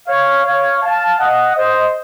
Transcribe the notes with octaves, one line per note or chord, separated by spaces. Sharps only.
C#5 F5
C#5 F5
F5 A5
D#5 F#5
C5 D#5